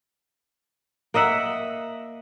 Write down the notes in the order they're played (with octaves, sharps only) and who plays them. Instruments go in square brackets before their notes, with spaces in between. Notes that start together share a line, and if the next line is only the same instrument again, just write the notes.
[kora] A#3 D#5 E5 F#5